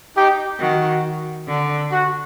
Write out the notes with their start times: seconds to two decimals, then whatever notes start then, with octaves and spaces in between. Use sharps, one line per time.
0.16 D#4 G4
0.60 D#3 F#4
1.48 D3
1.91 F#4